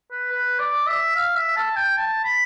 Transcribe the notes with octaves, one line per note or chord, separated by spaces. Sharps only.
B4
B4
D5
E5
F5
E5
A5
G5
A5
B5